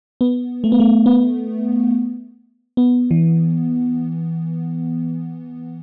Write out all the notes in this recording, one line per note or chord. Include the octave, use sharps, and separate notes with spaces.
B3
A3
B3
A3
B3
B3
E3